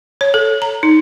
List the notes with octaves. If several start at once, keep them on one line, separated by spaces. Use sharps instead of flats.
C#5
A4
A#5
D#4